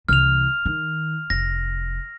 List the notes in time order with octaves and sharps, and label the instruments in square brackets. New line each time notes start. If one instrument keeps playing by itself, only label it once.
[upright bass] C2 E3 [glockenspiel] F6 F7
[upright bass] D#3
[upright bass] F1 [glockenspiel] A#6